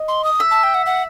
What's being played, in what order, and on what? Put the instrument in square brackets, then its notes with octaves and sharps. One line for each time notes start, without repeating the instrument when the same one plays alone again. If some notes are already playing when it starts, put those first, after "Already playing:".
Already playing: [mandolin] D#5
[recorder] C6
D#6
[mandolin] E5
[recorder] A5
G5
F#5
F#5